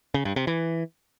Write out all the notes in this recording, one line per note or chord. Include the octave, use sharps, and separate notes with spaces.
C#3
G2
C3
E3